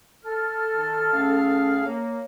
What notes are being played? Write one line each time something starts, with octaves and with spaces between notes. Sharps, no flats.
A4 F6
D#3
A2 C#4 G#4 F5
A#3 C#5